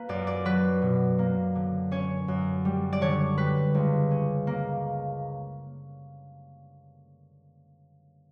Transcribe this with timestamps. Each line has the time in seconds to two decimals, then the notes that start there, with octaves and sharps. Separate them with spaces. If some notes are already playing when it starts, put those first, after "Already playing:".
Already playing: A#3 B4
0.09 F#2 D5
0.27 D5
0.45 F#3 B4
0.82 B2
1.19 A#3
1.55 D3
1.91 C#4 C#5
2.28 F#2
2.65 G3
2.93 D5
3.01 D3 C#5
3.38 G3 B4
3.74 C#2
4.11 C#4
4.47 A#3